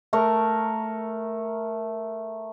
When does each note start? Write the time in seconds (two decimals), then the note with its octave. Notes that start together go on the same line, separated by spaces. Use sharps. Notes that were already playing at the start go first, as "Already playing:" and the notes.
0.13 A3 A#4 C#6